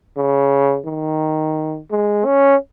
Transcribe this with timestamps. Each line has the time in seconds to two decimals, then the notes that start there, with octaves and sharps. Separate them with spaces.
0.17 C#3
0.86 D#3
1.91 G#3
2.25 C#4